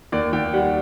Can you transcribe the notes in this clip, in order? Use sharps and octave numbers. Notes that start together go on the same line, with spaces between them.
D#2 D5
D#2 G5
G3 F#5